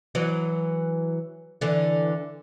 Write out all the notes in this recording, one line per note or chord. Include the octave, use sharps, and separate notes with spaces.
E3 F#3
D3 E3